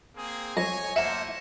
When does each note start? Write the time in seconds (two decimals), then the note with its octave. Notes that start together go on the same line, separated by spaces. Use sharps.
0.16 A#3 C4 G#4
0.57 F2 C#5 G#5 A#6
0.96 A3 A#3 C5 E5 F#5 A#5 C#7 E7